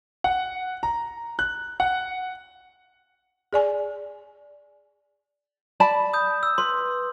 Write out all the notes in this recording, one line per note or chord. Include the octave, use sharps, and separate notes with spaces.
F#5
A#5
F#6
F#5
G#4 D5 G#5
D5 A5 B5
D#6 G6
E6
B4 C6